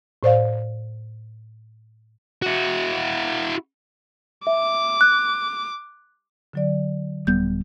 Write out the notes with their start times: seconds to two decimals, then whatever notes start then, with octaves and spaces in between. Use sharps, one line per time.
0.23 A2 C5 D5 F5
2.42 E4 F#4
4.47 E5 D6
5.01 F#6
6.53 D3 F#3 D5
7.27 D#1 G3 B3 G6